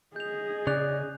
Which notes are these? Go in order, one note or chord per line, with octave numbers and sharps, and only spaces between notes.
G#4 D#5 G6 F7
C#3 D5 F#6 F7